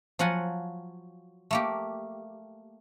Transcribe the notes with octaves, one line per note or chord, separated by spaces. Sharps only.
F3 F#3 F4 F#5 G#5
A3 A#3 G4